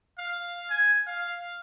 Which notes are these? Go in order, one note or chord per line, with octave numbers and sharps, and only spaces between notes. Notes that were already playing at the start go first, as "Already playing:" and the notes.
F5
G#5
F5